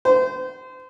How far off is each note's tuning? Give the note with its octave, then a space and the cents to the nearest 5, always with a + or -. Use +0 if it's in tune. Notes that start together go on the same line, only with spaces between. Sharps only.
C5 -30